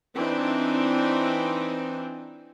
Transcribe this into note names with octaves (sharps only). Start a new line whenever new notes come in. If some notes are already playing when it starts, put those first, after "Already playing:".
E3 C4 D4 D#4